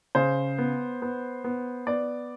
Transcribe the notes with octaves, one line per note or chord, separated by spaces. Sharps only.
C#3 C5
B3
B3
B3
B3 D5